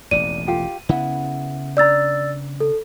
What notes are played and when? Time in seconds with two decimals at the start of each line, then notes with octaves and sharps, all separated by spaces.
0.11 E1 A1 F2 D5 D#7
0.47 F4 G4 A4
0.89 C#3 B3 E4 F#5
1.77 D4 D5 A#5 E6 A6
2.60 A4